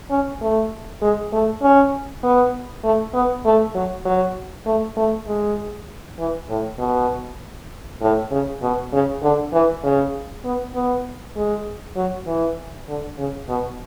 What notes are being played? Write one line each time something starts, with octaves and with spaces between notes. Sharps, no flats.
C#4
A3
G#3
A3
C#4
B3
A3
B3
A3
F#3
F#3
A3
A3
G#3
E3
A2
B2
A2
C#3
B2
C#3
D3
E3
C#3
B3
B3
G#3
F#3
E3
D3
C#3
B2